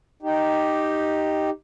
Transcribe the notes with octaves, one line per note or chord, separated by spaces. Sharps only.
D#4 G4